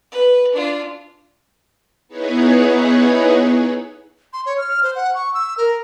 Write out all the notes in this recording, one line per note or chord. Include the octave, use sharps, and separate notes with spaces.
B4
D4 F4
B3 D#4 E4 G#4 B4 C#5
C6
C#5
F6
C5
F#5
C#6
E6
A#4